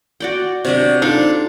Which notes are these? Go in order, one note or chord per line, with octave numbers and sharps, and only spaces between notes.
F#4 D5 G5
C3 F#3 D4 C5 D5
D4 D#4 F4 A4 F5